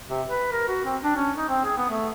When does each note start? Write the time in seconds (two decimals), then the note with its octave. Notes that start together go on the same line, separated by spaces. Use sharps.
0.09 C3
0.29 B4
0.52 A#4
0.68 F#4
0.85 C4
1.03 D4
1.16 C#4
1.37 D#4
1.49 C4
1.65 G#4
1.77 B3
1.90 A3